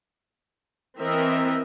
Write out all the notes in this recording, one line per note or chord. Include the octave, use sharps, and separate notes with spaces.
E3 C4 A#4 D#5 E5